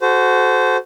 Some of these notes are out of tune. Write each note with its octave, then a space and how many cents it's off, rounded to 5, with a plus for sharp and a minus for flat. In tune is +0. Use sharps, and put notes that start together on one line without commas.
F#4 +0 A4 -30 C5 -20